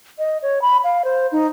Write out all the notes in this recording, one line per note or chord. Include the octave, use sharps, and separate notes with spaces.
D#5
C#5
B5
F5
C5
D#4